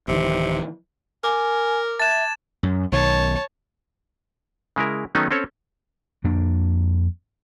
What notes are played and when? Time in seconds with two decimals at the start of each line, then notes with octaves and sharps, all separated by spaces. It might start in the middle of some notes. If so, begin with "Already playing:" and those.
0.08 D1 C3 D#3 E3
1.24 A#4 G#5 D6
2.00 E5 A5 F#6 G#6 A6 E7
2.63 F#2
2.92 B1 D#3 C#5 A5
4.76 C#3 G#3 E4 A#4
5.15 D#3 F#3 A3 B3 C#4 D#4
5.31 C4 C#4 A4 C#5
6.24 F2 A#3 D4